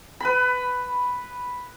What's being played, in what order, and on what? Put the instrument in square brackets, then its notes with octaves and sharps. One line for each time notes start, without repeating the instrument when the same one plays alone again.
[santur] B4 B5